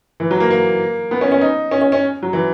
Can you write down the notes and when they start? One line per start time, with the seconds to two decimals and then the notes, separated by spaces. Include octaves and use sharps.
0.20 E3
0.31 F#3
0.40 A#3
0.51 A#3
1.11 B3
1.21 C#4
1.32 C#4
1.41 D#4
1.71 C#4
1.82 C#4
1.92 C#4
2.23 F#3
2.33 E3